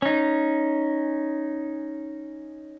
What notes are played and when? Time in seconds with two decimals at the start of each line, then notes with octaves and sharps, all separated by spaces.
0.02 C#4 D#4